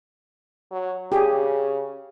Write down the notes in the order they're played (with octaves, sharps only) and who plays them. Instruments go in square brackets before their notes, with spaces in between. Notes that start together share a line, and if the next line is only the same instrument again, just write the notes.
[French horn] F#3
[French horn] C#3 [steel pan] G4 G#4